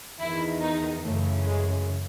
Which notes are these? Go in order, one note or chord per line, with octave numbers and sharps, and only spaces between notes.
E2 D#3 E4
D#4
F#2 C#3 E3 A3
G#3